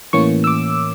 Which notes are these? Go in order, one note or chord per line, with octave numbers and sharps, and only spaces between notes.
A2 E3 A#3 C#4 C#6
E6
D6